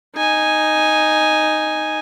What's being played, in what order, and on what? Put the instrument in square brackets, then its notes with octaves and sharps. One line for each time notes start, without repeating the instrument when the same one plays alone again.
[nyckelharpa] D#4 G#5